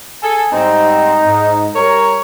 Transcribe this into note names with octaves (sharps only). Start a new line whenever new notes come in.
G#4 A4 G#5
G#2 G3 C4 D#4
G#2
G3 A#4 C#5